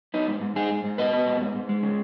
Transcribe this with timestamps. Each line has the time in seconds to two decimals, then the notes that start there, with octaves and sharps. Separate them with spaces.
0.14 B3 D#4
0.27 G#2
0.41 G#2
0.56 G#2 D#4 G#4
0.71 G#2
0.84 G#2
0.98 B3 B4 D#5
1.13 B3
1.27 G#2
1.41 G#2
1.55 G#2
1.69 G#3
1.83 C#3